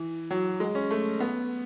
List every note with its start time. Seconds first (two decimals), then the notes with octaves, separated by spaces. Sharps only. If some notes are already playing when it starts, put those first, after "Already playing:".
Already playing: E3
0.31 F#3
0.60 G#3
0.75 C#4
0.91 A3
1.20 B3